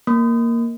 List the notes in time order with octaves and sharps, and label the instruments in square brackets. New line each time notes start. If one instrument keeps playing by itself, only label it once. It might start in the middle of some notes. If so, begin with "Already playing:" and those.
[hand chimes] A#3